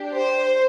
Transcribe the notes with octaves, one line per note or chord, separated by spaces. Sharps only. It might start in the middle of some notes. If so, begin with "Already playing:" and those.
Already playing: D4 G4
C5